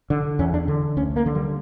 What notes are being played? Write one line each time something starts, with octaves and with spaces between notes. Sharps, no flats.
D3
E2 C#4
D4
D3
D2 C#4
A#3
D3
G3